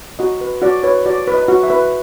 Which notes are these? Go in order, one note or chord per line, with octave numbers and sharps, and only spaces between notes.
F#4 D#5
B4
F#4 D5
B4 C#5
F#4 D5
B4
D#5
F#4
E5
B4